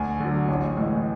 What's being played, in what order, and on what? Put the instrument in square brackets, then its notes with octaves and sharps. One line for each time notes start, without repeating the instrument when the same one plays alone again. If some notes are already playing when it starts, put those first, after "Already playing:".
Already playing: [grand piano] D2 G#5
D3 F#3
A1
A2 E3 G#3